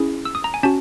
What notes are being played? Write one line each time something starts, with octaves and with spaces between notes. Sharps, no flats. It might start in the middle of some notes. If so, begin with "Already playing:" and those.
Already playing: C#4 E4 G#4
E6
D#6
A#5
G#5
C#4 F#4 A5